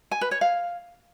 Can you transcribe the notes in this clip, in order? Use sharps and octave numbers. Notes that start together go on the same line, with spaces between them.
G#5
B4
C#5
F5